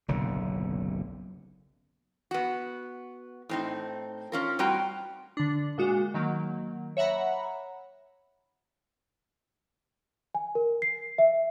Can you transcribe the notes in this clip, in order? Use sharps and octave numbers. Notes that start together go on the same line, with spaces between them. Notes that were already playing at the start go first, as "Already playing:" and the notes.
F#1 B1 D3
B3 F#4
A2 C4 D#4
C#4 F4 A#4
A2 G3 C4 F#4 G5 A#5
D3 D4
A#2 G#3 F#4
D#3 F#3 A#3
C#5 E5 F#5 A#5 B5
G#5
A#4
C7
E5